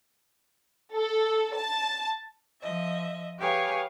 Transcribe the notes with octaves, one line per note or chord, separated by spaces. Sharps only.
A4
A5
F3 D#5 E5
G4 G#4 B4 C#5 F5 G#5